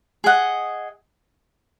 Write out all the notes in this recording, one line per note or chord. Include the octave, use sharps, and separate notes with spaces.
G#4 D#5 F#5